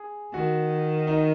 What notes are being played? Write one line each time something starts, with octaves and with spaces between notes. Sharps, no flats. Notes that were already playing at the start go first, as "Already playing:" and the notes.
Already playing: G#4
D#3 F#4
D#4